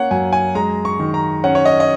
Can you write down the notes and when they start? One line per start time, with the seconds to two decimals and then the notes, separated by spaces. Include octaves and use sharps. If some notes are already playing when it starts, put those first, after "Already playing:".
Already playing: A#3 C#4 C#5 F#5
0.11 F#2 G#5
0.33 G#5
0.55 G#3 A#5
0.85 C#6
0.99 D#3
1.14 A#5
1.44 C#4 F#5
1.55 C#5
1.65 D#5
1.80 D#5